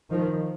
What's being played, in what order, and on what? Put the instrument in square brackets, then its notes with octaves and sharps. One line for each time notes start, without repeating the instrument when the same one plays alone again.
[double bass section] D#3 F3